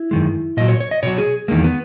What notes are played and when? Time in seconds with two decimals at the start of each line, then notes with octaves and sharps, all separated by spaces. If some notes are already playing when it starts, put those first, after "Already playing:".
Already playing: E4
0.11 F#2 D#3 G#3
0.57 A#2 F#3 D#5
0.68 C#5
0.80 C#5
0.91 D#5
1.03 B2 F#3 C#5
1.18 G#4
1.48 E2 D#3 G#3 A#3
1.64 B3